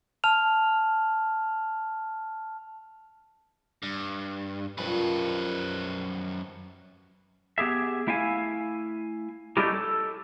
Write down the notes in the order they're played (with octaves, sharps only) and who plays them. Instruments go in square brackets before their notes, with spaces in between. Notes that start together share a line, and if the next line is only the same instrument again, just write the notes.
[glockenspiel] A5 F6 F7
[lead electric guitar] G2
[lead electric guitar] F#2 B4 [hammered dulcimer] D#3 F3 G3
[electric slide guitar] B3 G4 G#4 E5
A3 E4 E5 F5 G#5
G3 A3 C#4 D#4 E4 G4
A4